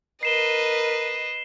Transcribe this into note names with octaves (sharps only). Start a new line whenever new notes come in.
A#4 B4 D#5 C7 E7 G7